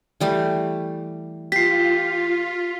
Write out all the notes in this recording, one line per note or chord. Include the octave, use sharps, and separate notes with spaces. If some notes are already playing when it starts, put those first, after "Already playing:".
E3 G3 A3
F4 G4 B6 C7